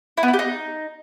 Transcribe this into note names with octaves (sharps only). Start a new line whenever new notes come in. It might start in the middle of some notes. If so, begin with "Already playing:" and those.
E4
B3
E4
G4
D#4